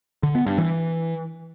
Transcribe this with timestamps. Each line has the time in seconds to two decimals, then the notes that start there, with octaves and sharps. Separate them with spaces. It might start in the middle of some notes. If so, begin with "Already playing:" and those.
0.23 D3
0.35 B3
0.46 G2
0.58 E3